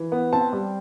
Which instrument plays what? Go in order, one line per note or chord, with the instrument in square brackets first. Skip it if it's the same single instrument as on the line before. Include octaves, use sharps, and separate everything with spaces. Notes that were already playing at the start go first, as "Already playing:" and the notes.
Already playing: [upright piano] E3
B3
C4 A5
G3